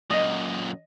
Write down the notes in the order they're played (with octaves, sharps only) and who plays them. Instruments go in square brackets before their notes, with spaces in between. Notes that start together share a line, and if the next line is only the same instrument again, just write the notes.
[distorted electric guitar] F#2 A#2 [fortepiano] D#5